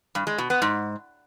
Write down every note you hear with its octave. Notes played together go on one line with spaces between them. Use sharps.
G2
G#3
B2
B3
G#2